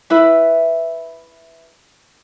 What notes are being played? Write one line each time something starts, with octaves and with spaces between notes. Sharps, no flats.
E4 B4 E5